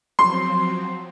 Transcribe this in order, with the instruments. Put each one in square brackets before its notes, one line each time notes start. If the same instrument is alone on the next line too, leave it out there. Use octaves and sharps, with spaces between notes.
[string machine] F3 F#3 C4 [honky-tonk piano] C6